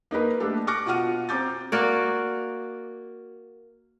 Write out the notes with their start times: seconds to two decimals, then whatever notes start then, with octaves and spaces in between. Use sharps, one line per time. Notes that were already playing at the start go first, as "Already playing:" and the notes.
0.11 A#3 D#4 A#4 B4
0.40 A3 A#3 D4 G4 A4
0.67 C#6 D6 F6 F#6 A#6 C#7
0.86 B2 F4 F#4 F#5 F6 D#7
1.29 C4 A#5 D6 G6 A6
1.72 A#3 F#4 D5